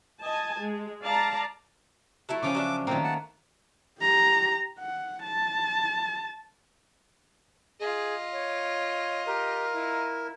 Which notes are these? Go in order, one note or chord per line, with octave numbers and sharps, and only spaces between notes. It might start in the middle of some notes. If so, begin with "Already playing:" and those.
D#5 G#5 A5
G#3
D5 F5 A5 A#5
F#3 A3 E4
C#3 F3 C#4 D6
F#3 D4 E5
A#2 D#3 A3 A#3 C4
F#5 A5
G4 A#5
F#5
A5
F4 G#4 D#5
C#5
G4 A#4
E4